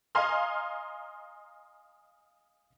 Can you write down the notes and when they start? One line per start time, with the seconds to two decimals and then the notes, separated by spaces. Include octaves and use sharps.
0.15 D#5 F5 G#5 A#5 C6 F6